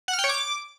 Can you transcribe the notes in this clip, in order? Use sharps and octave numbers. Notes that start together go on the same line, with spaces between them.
F#5
F6
G5
C#5
D6